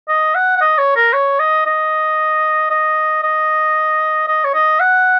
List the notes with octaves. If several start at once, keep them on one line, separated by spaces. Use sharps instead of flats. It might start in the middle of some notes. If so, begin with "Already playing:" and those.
D#5
F#5
F#5
D#5
C#5
A#4
C#5
D#5
D#5
D#5
D#5
D#5
C#5
D#5
F#5